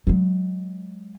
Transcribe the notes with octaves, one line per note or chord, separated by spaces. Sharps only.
F#3 G#3